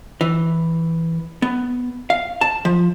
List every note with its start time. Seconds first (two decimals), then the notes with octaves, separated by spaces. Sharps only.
0.21 E3
1.42 B3
2.10 F5
2.41 A5
2.65 F3